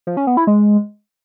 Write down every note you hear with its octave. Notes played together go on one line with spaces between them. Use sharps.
F3
C#4
B3
E4
G#3